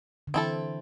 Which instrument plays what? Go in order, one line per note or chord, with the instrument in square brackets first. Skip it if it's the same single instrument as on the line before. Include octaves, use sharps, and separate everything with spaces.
[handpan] D3
[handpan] E3 [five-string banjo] C4 E4 A4